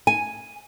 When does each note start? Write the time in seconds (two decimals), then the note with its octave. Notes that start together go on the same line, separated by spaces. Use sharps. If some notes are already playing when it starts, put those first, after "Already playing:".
0.07 G#5